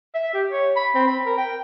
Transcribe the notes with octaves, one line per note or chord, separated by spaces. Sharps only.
E5
G4
C#5
B5
C4
B5
A#4
G5